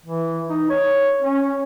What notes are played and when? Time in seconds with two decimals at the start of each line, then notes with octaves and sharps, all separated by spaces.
0.05 E3
0.50 D#4
0.70 C#5
1.22 C#4